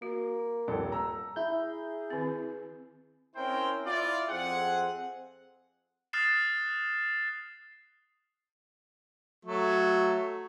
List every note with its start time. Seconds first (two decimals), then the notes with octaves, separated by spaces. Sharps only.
0.02 A#3 F#4
0.68 D#1 A4
0.92 A#5 E6
1.36 E4 G#4 G6
2.10 D#3 C4
3.36 C4 C#4 E4 A#4 C5 G5
3.86 E4 F4 D5
4.29 F2 C4 G#4 F#5
6.13 D#6 F6 F#6 A6 C7 E7
9.45 F#3 A3